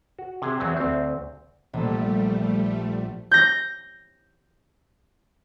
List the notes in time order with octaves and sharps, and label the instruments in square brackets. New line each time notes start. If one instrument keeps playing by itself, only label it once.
[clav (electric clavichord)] F#4
C3 G#4
E2 F#3 C4
D2 C4
[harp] A#1 A4 [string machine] G3 A3
[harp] G6 A#6